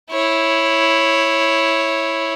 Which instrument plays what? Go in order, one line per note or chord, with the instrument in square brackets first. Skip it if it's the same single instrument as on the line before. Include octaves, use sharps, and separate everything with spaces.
[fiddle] E4 C#5